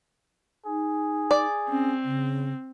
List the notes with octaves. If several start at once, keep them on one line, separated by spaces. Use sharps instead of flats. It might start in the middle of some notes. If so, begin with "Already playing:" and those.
D#4 G#4
D5
C4 C#4
C#3